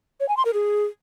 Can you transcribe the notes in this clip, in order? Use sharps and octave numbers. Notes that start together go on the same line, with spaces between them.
C#5
G#5
C6
A#4
G#4